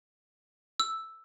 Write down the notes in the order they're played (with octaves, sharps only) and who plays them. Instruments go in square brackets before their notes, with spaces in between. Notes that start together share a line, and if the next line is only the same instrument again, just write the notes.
[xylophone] E6